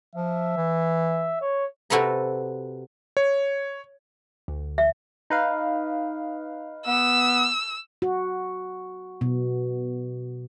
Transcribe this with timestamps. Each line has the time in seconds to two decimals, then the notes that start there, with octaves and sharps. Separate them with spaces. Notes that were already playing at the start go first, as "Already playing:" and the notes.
0.15 F3 E5
0.57 E3
1.41 C#5
1.90 C3 F#4 A4 B4 A#5
3.17 C#5
4.48 D2
4.78 E5
5.30 D#4 B4 F5
6.86 B3 E6
8.02 F#4
9.21 B2